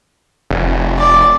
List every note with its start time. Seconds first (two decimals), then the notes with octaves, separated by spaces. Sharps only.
0.50 F1
0.98 D5